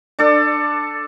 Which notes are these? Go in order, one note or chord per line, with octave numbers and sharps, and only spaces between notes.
D4 A4 D5